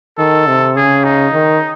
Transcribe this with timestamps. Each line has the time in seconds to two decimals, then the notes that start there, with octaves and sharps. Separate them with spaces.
0.19 D#3 A4
0.48 C3
0.76 C#3 G#4
1.04 D#4
1.33 D#3